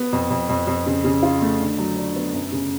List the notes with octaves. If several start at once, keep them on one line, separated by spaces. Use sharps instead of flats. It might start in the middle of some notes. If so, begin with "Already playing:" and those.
Already playing: B3
F2
F2
F2
F2
C#3
C#3
F4
A3
D3
F#3
D4
B3
F#2
C#3